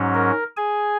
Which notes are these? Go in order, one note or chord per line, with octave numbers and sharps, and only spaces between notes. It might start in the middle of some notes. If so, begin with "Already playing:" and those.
Already playing: G#2 F#3 C#4
A#4
G#4 G#5